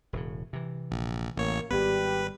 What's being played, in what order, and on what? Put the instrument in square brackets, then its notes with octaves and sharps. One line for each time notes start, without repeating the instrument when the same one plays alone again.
[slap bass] E1 A2 C#3
C3 E3
[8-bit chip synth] A#1
[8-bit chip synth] A1 C#5 [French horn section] A#3
[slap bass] G#1 B3 [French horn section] G3 G4 [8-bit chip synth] B4